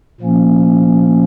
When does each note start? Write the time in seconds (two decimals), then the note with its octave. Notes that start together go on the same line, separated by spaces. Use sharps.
0.20 A#2 F3 A#3 C#4